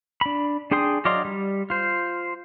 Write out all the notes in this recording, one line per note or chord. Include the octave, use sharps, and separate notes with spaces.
D4 B5
D4 G#4 G5 C6 D#6
F#3 D5 D#5 F5 C6
G3
F4 C5